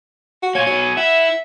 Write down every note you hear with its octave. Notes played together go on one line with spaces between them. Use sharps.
F#4
A#3 F4 C#5 G#5
F#3 B3 C#5
E4 E5 F#5